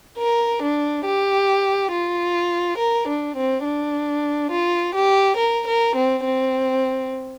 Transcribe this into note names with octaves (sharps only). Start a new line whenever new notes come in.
A#4
D4
G4
F4
A#4
D4
C4
D4
F4
G4
A#4
A#4
C4
C4